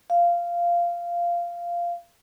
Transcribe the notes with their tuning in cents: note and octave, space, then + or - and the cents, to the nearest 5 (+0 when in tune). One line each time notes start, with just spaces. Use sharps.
F5 -10